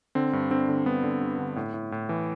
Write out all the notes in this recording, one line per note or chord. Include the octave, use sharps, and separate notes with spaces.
D3 C4
G2
D3 C4
D3
G2 B3
D3
G2
D3
A2
A2
A2
E3